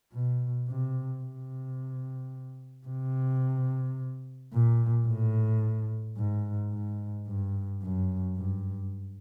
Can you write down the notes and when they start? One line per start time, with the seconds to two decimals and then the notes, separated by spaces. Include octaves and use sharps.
0.13 B2
0.68 C3
1.23 C3
2.87 C3
4.53 A#2
5.08 A2
6.17 G#2
6.72 G#2
7.27 G2
7.82 F#2
8.37 G2